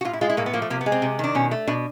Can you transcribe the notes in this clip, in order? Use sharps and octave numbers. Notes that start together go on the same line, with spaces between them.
F#4
A2 F4
E4
G#3 F4
E4
A2 A#3
B3
F3 A#3
A3
C3 A#3
B3
G#3
C4
C3
D#3 D4
B2 C#4
A3
B2 D4